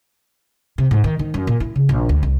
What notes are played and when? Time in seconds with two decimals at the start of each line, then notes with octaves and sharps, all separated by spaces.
0.78 C3
0.91 G#2
1.04 D#3
1.19 D#3
1.34 F#2
1.47 A#2
1.60 E4
1.76 C#3
1.89 A#1
2.09 D2
2.23 C2